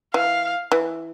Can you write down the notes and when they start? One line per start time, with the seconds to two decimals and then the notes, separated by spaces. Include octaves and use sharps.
0.14 E3 F5
0.72 E3